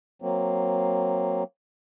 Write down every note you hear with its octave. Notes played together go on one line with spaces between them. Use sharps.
F#3 A#3 C4